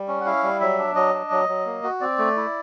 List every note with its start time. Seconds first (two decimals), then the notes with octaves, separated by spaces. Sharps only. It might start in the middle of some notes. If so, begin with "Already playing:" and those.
Already playing: G3
0.08 C#4
0.21 F#5
0.26 E4 F5
0.43 G3
0.61 F#3 E5
0.79 D4
0.95 F#3 D#5
1.14 D4
1.31 F#3
1.49 F#3
1.66 A#3
1.83 F#4
2.01 C4 D5
2.18 A3
2.36 E4